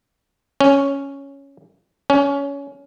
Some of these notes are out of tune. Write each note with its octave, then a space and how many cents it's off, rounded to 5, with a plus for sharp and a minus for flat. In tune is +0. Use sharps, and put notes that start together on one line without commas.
C#4 +0
C#4 +20